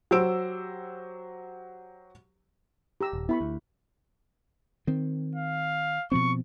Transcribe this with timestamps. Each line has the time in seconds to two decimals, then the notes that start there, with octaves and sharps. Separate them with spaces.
0.11 F#3 G4 C5 E6 D7
3.01 G4 A#5 E6
3.13 D#1
3.29 B3 E4 B5 C#6
3.41 D2
4.87 D#3 C4
5.35 F5
6.12 B2 F3 C4 C#6